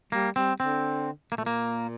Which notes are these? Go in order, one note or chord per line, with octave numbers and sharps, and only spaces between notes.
G3 A#3
G3 C4
D3 C4
A#2 A#3
A3
A#3